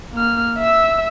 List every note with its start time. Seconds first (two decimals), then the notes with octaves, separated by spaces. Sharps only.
0.14 A#3 F6
0.58 E5 E6